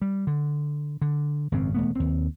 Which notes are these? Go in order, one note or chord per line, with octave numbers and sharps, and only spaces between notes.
G3
D3
D3
G#1 F#2 C#3 C4
E1 A3 B3
D#2 C4